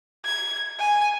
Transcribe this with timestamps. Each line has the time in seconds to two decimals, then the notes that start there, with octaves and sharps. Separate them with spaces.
0.25 G#6
0.79 G#5